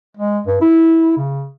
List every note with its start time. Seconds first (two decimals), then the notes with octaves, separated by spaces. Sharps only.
0.17 G#3
0.47 G2
0.61 E4
1.17 C#3